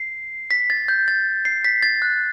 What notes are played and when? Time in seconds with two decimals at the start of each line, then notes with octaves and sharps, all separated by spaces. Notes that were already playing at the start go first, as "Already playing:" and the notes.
Already playing: C7
0.51 B6
0.70 A6
0.88 G6
1.08 A6
1.45 C7
1.64 B6
1.83 A6
2.02 F#6